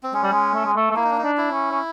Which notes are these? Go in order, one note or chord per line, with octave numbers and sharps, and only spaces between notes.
C4
G#3 C#4
G3
G#3
A3
G#3
A3
A3
A#3 E4
D#4
D4
D#4
D4
E4
C#4
C#4